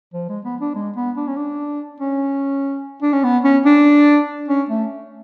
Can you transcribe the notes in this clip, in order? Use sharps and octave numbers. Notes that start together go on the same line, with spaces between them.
F3
G#3
B3
D4
G#3
B3
D4
C#4
D4
C#4
D4
C#4
B3
C#4
D4
C#4
A3